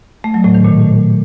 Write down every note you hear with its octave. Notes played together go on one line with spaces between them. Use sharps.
A3
F#3
A2
D#3
A#2